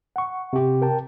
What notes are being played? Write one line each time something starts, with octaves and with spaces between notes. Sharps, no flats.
F#5 C#6
C3 G4
A#4 G5 A5